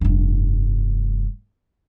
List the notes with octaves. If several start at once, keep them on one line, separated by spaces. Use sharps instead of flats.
F1 G2